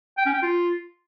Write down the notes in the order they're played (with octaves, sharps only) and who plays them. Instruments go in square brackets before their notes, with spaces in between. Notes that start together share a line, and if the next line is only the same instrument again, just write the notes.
[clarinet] G5
C#4
G5
F4